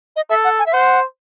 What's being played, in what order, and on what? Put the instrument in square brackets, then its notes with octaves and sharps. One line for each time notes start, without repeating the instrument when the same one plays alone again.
[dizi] D#5
[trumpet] A4 [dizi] E5
[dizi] F#5
G#5
E5
[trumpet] C5 [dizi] F#5